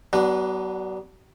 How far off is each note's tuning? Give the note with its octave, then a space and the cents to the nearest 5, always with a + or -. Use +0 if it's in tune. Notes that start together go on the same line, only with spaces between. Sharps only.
F#3 +40 B3 +0 D4 +0